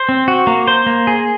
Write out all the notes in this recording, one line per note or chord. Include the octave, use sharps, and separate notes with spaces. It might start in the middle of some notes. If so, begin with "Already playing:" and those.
Already playing: C5
C4
F#4
A#3
C5
A#3
G#4